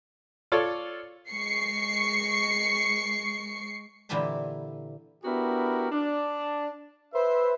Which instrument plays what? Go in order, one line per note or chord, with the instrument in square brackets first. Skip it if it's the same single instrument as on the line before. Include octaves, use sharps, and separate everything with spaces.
[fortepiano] F4 A4 C#5 D5
[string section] G#3 C#6 C7 C#7
[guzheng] A#2 D3 E3 G4 B4 A5
[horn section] B3 D4 E4 F#4 G4 A#4
D4
B4 C5 E5